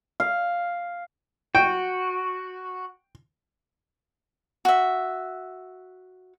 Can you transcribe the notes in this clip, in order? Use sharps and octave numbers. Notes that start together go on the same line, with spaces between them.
F5
F#4 G5
F#4 E5